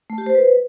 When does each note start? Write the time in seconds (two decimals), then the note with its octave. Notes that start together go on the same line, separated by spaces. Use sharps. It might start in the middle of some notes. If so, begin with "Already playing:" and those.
0.10 A3
0.18 G4
0.26 C5
0.35 B4